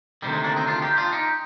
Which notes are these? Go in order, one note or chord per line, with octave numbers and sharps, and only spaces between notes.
D2 C3 D#3 G3
G#3
A#3 D4
C4 D#4
D4 F4
D#4 G4
D4 F4
D#4 G4